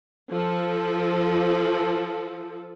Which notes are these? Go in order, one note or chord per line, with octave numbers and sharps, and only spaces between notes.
F3 A4